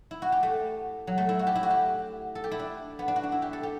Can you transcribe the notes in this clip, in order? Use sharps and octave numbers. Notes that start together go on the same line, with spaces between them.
E4
F#4
G4
A3
F#3
A3
E4
F#4
G4
E4
F#4
G4
A4
G4
E4
D4
B3
D4
F#4
D4
E4
G4
A4
G4